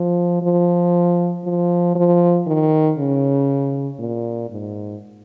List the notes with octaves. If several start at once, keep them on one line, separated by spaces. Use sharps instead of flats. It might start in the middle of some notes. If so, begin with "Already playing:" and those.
Already playing: F3
F3
F3
F3
D#3
C#3
A#2
G#2